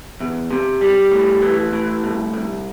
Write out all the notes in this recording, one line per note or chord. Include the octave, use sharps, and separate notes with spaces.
E2
C3
G3
A2
E3
A2
C2
C2